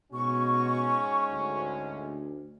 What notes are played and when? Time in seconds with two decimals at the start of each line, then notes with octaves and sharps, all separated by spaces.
0.12 G#2 B2 G#3 C#4 F#4 C#6
1.30 D2